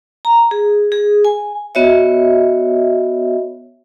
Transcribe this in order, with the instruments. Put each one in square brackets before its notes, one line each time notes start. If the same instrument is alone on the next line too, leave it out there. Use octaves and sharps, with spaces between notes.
[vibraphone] A#5
G#4
G#4
G#5
B3 F#4 C#5 D#5 E5